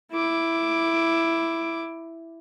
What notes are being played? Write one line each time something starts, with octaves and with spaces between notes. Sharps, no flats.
E4 D6